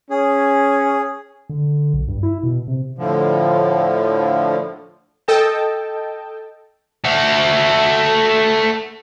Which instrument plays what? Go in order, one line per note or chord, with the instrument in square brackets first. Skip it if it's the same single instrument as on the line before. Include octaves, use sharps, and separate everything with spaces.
[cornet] C#4 [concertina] G#4
[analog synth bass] D3
B1
G2
E4
B2
C3
[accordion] A2 D3 F3
[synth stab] A4 D#5 G5 A5
[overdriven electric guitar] A3 F#4